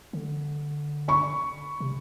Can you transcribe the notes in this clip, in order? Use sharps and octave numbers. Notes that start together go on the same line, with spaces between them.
D3
B5 C#6
C3